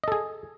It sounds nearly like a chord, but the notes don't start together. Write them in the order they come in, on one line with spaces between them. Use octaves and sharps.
D#5 A4 G#4